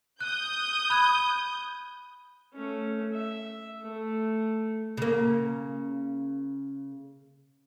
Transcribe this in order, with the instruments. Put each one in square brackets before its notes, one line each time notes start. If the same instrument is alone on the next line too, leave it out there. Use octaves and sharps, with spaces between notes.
[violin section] D#6 G6 [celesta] F#6
[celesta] B5 F#6 G#6
[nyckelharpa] A3 C#4
E5
A3
[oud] C#3 A#3